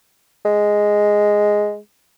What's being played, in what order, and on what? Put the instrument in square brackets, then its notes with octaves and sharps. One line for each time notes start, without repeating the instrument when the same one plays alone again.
[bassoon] G#3